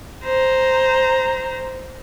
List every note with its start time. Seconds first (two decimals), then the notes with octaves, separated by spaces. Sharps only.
0.25 C5 A#5